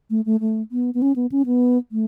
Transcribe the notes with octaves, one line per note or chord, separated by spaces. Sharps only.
A3
A3
A3
B3
B3
C#4
B3
C#4
B3
A3